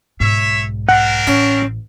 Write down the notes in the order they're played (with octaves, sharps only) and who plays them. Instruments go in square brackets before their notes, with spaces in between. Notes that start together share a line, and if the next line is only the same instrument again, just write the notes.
[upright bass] B1 G#2 [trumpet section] C#5 E5
[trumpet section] C4 D4 A#4 [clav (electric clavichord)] F#5
[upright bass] A1 [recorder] C#4